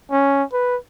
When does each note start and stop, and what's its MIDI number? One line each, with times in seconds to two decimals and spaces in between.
0.11 0.43 61
0.53 0.77 71